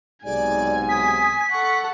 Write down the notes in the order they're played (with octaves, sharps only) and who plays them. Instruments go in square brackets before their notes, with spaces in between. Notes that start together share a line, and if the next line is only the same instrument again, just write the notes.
[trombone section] B1 G#2 C3 [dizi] D5 [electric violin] G#5
[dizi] D#6 [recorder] B6
[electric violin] A4 F#5 [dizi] C#6